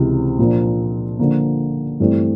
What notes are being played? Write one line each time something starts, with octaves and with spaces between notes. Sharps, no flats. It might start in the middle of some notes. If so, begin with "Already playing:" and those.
Already playing: C#2 C3 E3
A#2 F3 A#3 D4
D3 F3 A#3 D4
G2 E3 A3 C4